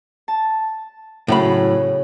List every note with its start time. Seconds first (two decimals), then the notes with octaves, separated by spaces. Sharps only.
0.28 A5
1.28 A2 C#3 F#3 B5